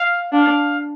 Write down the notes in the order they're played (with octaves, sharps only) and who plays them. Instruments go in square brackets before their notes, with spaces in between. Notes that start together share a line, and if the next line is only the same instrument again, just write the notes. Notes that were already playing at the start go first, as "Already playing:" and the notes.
Already playing: [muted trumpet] F5
[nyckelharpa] D4 [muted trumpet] F5